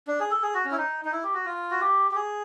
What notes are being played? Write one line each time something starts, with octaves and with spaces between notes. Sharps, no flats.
D4
G#4
A4
G#4
F#4
C#4
E4
D#4
D#4
E4
G4
F#4
F4
F#4
G4
G4
G#4